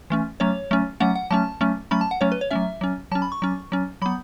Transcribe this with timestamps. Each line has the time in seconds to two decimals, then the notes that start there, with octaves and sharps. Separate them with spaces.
0.10 E3 A3 C#4
0.40 F#3 A3 C#4 C#5
0.71 F#3 A3 C#4
1.00 F#3 A3 C#4 F#5
1.16 F#5
1.31 F#3 A3 C#4 A5
1.61 F#3 A3 C#4
1.91 F#3 A3 C#4 B5
2.01 A5
2.11 F#5
2.21 F#3 A3 C#4 C#5
2.32 B4
2.41 C#5
2.51 F#3 A3 C#4 E5
2.81 F#3 C#4
3.12 F#3 A5
3.15 C#4
3.22 B5
3.32 C#6
3.42 F#3 C#4
3.72 F#3 C#4
4.02 F#3 B3 B5